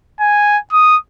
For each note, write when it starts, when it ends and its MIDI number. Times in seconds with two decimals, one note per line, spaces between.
0.20 0.58 80
0.72 0.97 87